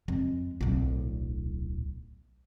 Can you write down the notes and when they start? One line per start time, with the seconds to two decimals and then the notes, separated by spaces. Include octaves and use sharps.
0.08 F2 G#3
0.61 D1 B1